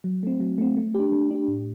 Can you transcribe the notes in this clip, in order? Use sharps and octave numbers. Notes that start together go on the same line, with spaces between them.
F#3
A3 C4
F#3
A3 C4
A3
D4 G4
A3
D4 G4
A2